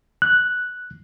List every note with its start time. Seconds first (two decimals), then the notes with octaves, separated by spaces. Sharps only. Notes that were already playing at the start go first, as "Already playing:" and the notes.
0.22 F#6